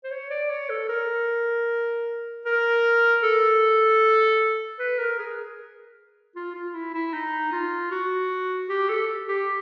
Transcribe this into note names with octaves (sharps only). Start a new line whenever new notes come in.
C5
C#5
D5
C#5
A4
A#4
A#4
A4
B4
A#4
G#4
F4
F4
E4
E4
D#4
F4
F#4
G4
A4
G4